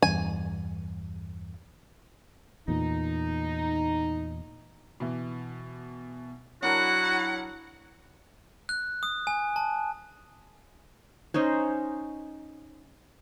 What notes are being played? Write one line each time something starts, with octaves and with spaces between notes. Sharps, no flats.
E2 G2 G#5
E2 A#2 D#4
B2 E3
F#3 D4 E4 F#4 A#4 F#5 A5
F#6
D#6
G#5
A5
C#4 D#4 C5 C#5